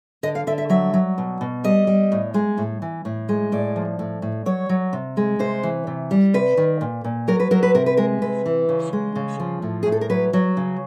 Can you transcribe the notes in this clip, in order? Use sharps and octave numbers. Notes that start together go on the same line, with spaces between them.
D3 D#5
F5
D3 E5
E5
F#3 E5
F#3
B2
B2
G3 D#5
G3
A2
G#3
A2
E3
A2
G#3
A2 D5
F3
A2
A2
F#3 C#5
F#3
C3
G#3
C3 C5
E3
C3
G3
C3 B4
D#3
A#2
A#2
F#3 A#4
B4
F#3 A#4
B4
C3 A#4
B4
G#3 A#4
C3 B4
E3
C#3
G#3
C#3
F3
A2
A2 G#4
A4
A#4
F#3 B4
F#3
C#3